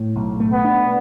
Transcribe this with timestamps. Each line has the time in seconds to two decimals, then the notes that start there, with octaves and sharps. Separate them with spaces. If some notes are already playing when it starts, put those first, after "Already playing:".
Already playing: A2
0.15 B1
0.40 A3
0.52 B3
0.65 D4